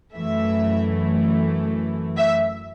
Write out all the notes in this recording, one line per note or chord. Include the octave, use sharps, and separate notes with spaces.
F#2 E3 A3 E5
E5